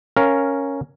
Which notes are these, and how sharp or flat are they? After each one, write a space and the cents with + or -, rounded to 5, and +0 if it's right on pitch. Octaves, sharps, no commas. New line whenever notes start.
C#4 +0 A#4 +0 F5 +0